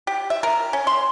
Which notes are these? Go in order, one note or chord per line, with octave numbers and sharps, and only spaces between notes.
G4
E5
A#4
C#4
C6